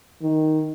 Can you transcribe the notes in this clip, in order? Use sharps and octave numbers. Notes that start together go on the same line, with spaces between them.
D#3